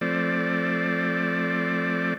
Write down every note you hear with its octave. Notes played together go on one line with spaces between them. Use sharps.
F3 A3 C4 D5